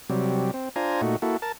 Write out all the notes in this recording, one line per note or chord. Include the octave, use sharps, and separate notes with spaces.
C3 F#3 G3
C4
D4 F4 C5 G#5 A#5
A#2 A3 D#4 F#4
A#3 E4 F#4 A4
A#4 A5